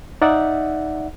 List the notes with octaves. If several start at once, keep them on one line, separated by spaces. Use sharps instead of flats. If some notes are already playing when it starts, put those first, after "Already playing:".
D#4 D5 E5 F#5